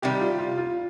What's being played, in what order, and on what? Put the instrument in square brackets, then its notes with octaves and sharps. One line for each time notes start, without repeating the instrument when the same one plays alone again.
[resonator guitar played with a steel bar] C3 D#3 G3 [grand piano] G4
[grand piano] F4
F4
F4